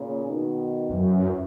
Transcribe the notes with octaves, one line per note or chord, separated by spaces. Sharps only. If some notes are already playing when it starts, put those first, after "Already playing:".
Already playing: A#2 C#3
B2 D#3
F#2 C#3 E3